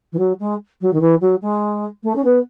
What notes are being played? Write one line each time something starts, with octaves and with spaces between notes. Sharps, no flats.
E3
F#3
G#3
F#3
D#3
E3
F#3
G#3
A3
C#4
B3